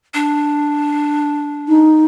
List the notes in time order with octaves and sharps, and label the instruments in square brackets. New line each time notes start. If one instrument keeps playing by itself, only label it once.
[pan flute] D4
[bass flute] D#4